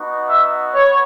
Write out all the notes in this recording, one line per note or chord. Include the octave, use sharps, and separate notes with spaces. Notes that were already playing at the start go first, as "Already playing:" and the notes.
Already playing: B3 D#4 F#4
E5
B3 C#5